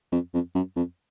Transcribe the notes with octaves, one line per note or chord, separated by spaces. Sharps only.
F2
F2
F#2
F2